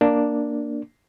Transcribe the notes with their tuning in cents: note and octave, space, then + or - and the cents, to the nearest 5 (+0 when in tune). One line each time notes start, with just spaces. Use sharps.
A#3 +0 D4 +0